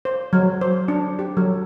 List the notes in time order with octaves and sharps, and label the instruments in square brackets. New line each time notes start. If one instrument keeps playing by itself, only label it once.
[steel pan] C5
F#3
C5
D4
G4
F#3